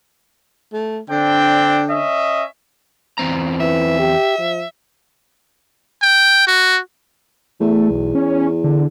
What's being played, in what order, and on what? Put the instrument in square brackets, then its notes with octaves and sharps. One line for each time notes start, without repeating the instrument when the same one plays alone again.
[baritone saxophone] A3
[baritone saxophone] D3 [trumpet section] C4 D4 G5
[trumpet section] C#4 D#5 E5
[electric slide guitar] E2 C4 A#5
[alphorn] E3 [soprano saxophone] E5
[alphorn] G4
F3
[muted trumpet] G5
F#4
[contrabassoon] E2 [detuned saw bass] A3
[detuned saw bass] B1
C#4
D3